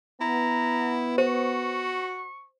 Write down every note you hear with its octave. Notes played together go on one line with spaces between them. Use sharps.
B3 E4 A#5
F#4 C5 C#6